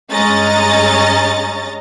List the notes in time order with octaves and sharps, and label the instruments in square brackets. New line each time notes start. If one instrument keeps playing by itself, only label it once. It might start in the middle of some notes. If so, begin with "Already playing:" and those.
[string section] G2 G#3 C#4 D#5 A#5 A6